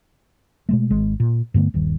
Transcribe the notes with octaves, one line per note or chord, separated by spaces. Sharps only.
B2 G#3 A3
G#1 G#3
A#2
G2 D3 A3 B3
D#1 G2 D#3